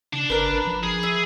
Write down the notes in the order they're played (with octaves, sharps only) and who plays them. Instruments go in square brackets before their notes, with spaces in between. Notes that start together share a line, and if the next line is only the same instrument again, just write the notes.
[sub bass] C#3 [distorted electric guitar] D4 A5
[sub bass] G1 [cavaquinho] A#4 B4
[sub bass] G#1
F3
[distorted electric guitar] G#4
[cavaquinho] E5